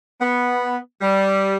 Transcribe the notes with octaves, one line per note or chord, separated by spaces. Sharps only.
B3
G3